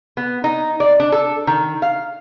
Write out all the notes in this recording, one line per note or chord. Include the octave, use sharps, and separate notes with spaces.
B3
D#4
D5
D4
A4
D#3
F5